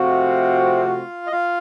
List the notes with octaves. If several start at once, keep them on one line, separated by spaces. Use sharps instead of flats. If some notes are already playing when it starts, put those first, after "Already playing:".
Already playing: C3 F3 A3 C4 F4 F#4 F5
D#5
F4 F5